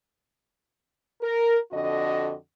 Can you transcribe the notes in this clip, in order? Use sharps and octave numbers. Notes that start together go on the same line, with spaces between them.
A#4
F2 D3 F#4 D#5